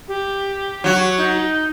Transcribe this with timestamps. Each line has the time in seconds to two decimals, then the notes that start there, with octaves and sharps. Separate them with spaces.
0.08 G4
0.84 F#3 F#4
1.18 D#4